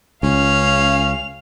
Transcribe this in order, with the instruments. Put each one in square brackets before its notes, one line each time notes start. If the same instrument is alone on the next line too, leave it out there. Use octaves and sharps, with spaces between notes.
[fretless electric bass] C#2 [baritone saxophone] C#4 [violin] F5 F7